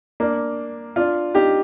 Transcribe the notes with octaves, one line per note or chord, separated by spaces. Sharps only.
A#3 D4
D4 F4
D#4 G4